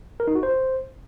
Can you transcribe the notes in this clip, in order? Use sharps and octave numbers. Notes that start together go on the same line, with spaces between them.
A#4
D#4
F#4
C5